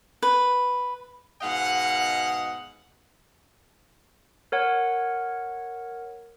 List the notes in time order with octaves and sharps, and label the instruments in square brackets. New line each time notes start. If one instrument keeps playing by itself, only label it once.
[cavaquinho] B4
[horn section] G#2 B2 D#5 F5 F#5
[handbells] A#4 C#5 F#5